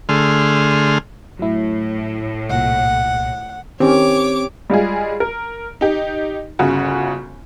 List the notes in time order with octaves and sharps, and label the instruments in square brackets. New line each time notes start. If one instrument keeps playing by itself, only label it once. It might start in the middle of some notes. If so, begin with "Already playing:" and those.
[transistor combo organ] D3 A3 G#4 C6 F6
[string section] A2 [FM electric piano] F#3 E4
[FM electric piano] C2 A#2 [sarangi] F#5
[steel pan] D#3 C#4 [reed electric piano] C4 [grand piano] G4 [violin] C#5 D6
[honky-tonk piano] G3 G#3 F4 G#4
A#4
D#4 G4
G1 C#3 F#4